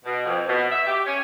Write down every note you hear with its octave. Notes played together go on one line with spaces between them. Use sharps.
B2
F2
B2
E5
G4
C#4